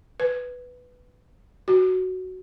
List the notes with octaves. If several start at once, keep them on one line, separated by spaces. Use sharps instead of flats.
B4
F#4